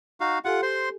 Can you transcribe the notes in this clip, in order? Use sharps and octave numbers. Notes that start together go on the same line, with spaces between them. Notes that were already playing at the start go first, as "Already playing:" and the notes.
D#4 F#4 F5
F4 G4 A4 F#5 G#5
C5 C6